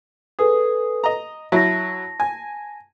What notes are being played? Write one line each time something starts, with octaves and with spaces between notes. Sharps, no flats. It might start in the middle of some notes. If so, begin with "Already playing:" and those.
G#4 A4 B4 D#6
D#5 A#5
F#3 E4 A5 A#6
G#5